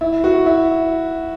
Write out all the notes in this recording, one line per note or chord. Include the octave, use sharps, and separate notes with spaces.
E4
F#4
E4